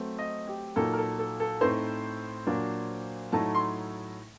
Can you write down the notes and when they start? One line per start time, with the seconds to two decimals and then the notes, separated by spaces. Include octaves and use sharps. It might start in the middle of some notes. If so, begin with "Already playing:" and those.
Already playing: F#3 A3 C4
0.18 D#5
0.47 G4
0.76 A#2 F#3 A#3 D#4 A4
0.93 A#4
0.97 A4
1.19 A4
1.40 A4
1.61 A2 A3 C4 D#4 C5
2.47 A#2 F#3 A#3 D4
3.32 A2 F#3 A3 D#4 A5
3.54 C6